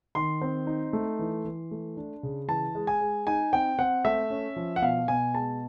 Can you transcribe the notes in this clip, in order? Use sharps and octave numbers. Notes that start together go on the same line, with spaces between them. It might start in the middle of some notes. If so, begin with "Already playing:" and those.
D#3 C6
C4
D#4
A3
E3
E3
A3
D4
C#3
E3 A5
G#3
G#5
G#3
D#4 G#5
C4 G5
C4 F#5
A3 E5
C#4
F3
F#5
B2 F5
B2 G#5
G#3 A5